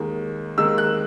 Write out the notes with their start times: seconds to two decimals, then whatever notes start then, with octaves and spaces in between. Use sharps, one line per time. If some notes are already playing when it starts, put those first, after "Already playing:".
Already playing: D#2 D#3 G#3
0.58 D#2 D#3 G#3 E6
0.78 F#6